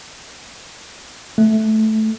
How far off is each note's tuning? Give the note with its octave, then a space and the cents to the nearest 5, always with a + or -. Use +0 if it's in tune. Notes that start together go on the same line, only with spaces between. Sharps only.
A3 -10